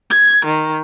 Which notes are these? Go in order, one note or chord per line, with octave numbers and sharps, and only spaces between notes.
G#6
D#3